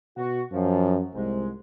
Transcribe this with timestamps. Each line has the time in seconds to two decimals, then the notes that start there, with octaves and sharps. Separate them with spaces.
0.17 B2 F#4
0.52 F#2 F3
1.15 C2 G#2 G#3